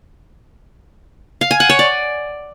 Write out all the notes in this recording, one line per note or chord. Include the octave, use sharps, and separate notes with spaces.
F5
G#5
F#5
C#5
D5